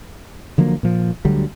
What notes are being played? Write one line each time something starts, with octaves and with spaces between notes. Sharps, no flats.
D3 F3 F#3 A#3
A#2 F3
D2 D3 F#3 G3